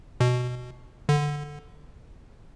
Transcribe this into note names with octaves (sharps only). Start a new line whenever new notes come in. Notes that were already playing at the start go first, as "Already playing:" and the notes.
B2
D3